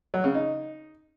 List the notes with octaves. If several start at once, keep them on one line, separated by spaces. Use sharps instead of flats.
F#3
C#3
D#4